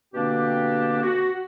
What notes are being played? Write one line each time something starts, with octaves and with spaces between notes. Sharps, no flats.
B2 D3 A#3 C4 D4 G4
F#4